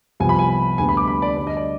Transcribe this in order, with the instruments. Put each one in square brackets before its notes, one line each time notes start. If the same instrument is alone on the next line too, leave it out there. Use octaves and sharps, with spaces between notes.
[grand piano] C2 C3 F3 B3 G#5
B5
G#5
D2 D3 G3 B3 G#5
B5
D6
B5
D5
D2 D3 G3 D5
D#5
D5